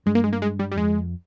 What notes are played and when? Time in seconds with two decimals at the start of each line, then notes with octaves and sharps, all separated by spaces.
0.06 G2 G#3
0.15 A#3
0.24 G#3
0.33 A#3
0.42 G#3
0.59 G3
0.72 G3
0.76 F2 G#3